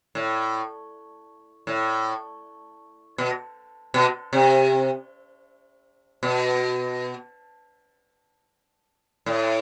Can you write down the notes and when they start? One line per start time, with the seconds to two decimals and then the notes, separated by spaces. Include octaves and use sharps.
0.15 A2
1.67 A2
3.18 B2
3.94 B2
4.33 C3
6.23 B2
9.26 A2